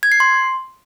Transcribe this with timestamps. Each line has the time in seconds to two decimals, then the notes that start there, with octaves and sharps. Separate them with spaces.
0.03 G#6
0.12 C7
0.20 C6